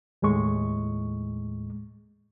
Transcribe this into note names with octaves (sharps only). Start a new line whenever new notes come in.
D#2 A2 G#3 C#6